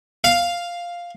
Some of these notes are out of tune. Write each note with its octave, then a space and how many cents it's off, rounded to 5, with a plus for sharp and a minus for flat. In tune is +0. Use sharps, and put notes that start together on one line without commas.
F5 +0